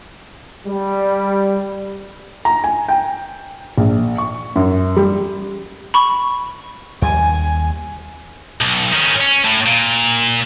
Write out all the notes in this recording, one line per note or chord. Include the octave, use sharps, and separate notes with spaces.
G3
A#5
G#5
G5
A#1
C#6
F#2
G3
B5 C#6
D#2 G3 G#5
B1
D#3 C#4
C#4
A2
A#2